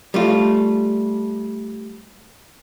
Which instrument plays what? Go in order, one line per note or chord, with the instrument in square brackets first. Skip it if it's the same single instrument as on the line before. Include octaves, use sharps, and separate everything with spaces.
[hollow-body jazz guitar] G3 A3 F4